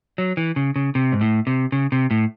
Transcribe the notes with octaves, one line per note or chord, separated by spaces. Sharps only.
F#3
E3
C#3
C#3
C3
G#2
A2
C3
C#3
C3
A2